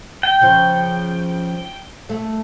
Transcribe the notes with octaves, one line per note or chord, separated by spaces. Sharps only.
G5
C#3 F3
A3